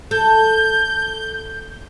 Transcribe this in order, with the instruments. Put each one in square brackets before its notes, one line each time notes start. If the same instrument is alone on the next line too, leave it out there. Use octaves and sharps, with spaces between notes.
[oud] A4 [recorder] G6